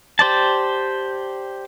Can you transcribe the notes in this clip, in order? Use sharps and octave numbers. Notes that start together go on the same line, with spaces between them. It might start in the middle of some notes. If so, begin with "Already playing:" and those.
G4 C5 D5 A5